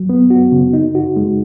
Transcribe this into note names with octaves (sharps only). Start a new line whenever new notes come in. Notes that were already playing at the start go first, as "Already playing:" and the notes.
Already playing: F#3
B3
F#4
C#3
D#4
F#4
G#3